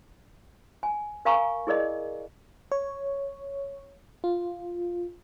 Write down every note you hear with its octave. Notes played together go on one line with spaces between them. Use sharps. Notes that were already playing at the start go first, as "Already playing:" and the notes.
G#5
A#4 F5 G#5 A#5 C#6
E4 G#4 A#4 D5 D#5
C#5
F4